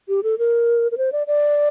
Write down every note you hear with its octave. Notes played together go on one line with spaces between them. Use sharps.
G4
A4
A#4
A#4
C5
D5
D5